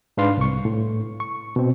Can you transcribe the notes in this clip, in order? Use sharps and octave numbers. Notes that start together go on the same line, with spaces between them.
G#2 D4 B4 F5 C6
C2 C#6
A2
C#6
B2 C4